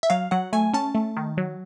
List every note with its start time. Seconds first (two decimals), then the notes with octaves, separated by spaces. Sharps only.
0.03 E5
0.10 F#3 F5
0.31 F#3 F#5
0.53 A3 G#5
0.73 C#4 A5
0.95 A3
1.17 D#3
1.37 F#3